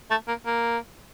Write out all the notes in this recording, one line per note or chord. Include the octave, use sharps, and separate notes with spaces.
A3
A#3
A#3